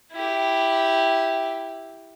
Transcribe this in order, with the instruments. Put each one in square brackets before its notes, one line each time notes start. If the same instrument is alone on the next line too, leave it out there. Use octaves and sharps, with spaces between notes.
[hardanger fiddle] E4 G4